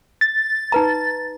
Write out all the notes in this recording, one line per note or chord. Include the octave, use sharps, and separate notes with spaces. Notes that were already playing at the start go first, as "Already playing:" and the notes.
A6
D#4 B4 A#5